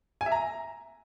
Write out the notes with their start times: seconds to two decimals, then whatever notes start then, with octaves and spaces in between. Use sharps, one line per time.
0.21 G#5
0.26 E5
0.32 A#5